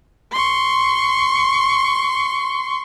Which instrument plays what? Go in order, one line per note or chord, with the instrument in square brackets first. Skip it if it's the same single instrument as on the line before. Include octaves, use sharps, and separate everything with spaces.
[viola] C6 C#6